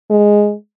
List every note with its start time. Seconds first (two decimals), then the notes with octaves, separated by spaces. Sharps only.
0.10 G#3